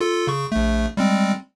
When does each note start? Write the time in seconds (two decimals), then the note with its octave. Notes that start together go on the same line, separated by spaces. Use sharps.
0.01 F4 A4
0.27 C#3 C#6
0.52 A#1 A3
0.97 G3 G#3 C4